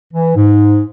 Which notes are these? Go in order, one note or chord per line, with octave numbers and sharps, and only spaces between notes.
E3
G#2